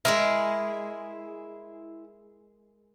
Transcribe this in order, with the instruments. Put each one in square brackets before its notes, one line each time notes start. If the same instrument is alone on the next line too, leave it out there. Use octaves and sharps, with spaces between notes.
[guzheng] G#3 G#4 A#4 [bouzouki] E4